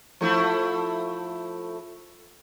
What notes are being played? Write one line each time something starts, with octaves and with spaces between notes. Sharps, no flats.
F3 A3 E4